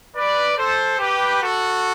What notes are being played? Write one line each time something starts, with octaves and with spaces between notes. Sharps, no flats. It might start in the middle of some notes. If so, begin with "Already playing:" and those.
B4 D5
A4 C5
G4 B4
F#4 A4